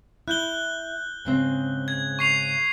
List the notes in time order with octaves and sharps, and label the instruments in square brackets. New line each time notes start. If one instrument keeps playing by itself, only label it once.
[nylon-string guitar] E4 [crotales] F#6 G6 G7
[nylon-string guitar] G#2 C#3 C4
[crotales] G#6
C#6 C7 F7